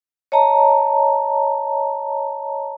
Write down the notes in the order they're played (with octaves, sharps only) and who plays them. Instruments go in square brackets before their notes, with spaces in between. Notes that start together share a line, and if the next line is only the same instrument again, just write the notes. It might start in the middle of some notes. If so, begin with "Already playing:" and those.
[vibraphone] C#5 D#5 A5 A#5